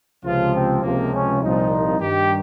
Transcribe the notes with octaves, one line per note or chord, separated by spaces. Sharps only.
C#2 C3 F3 F4
C4
C#2 C3 F3 A#3
C#4
C2 A#2 F3 D#4
G2 D#3 G4